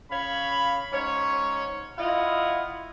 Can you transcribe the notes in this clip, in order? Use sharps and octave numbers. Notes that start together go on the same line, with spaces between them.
C#3 C#5 F5 B5
G#2 C#4 C#5
E4 F4 D#5 F#5